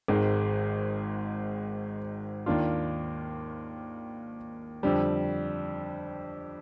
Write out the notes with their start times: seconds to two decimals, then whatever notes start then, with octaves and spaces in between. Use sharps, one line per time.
0.08 G#1 G#2 D#3 G#3
2.46 D#2 D#3 A#3 D4 F4
4.83 F2 D3 G3